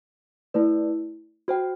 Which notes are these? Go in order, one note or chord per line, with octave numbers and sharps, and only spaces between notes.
A3 E4 B4 D5
F#4 C5 G5